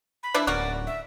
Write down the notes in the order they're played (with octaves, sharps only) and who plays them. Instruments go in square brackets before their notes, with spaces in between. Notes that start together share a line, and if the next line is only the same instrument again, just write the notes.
[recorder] B5
[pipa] F3 D4 E4
[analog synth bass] D1 [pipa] A#3 C#4 F#4 [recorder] D5
[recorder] E5